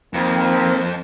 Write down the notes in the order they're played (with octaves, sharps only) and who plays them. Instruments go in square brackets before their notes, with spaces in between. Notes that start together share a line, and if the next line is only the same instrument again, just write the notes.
[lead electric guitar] F2 [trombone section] D#3 A#3 C4